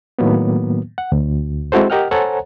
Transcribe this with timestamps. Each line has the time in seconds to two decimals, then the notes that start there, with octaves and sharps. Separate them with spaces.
0.19 A2 D#3 F#3 A#3 B3
0.98 F#5
1.12 D2
1.72 G#3 C4 E4 F#4 A4 C5
1.90 G4 A#4 D#5 F#5 G5 F6
2.11 A4 C5 C#5 F#5 G#5 A#5